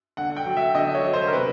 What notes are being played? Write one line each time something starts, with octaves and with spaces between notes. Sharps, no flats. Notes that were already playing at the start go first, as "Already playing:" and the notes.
D3 F#5
G5
F#3
E5
D3 D#5
C#5
F#3
C5
A#4
C3 B4